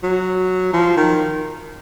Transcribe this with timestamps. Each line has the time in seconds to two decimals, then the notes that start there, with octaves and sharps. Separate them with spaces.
0.04 F#3
0.73 F3
0.97 D#3